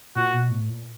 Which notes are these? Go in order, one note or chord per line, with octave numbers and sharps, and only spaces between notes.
A#2 F#4
B2
A2
A#2